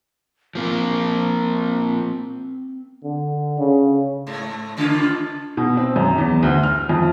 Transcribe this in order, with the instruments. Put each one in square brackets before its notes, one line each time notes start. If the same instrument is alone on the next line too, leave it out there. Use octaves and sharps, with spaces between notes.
[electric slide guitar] F3 A#3 F4 [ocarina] C4
[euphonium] D3
C#3
[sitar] G#2 A3
A2 C#3 F4
[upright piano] B2
C4
F#2
E2
D2
F6
F2